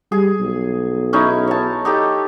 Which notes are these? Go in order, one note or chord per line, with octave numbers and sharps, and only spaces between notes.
G3 G#4
B1
C#4 D#4 E4
C#5 A5
D#4 G4 A4